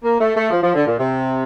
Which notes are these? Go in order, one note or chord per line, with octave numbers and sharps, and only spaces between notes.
A#3
A3
A3
F3
F3
D3
A#2
C3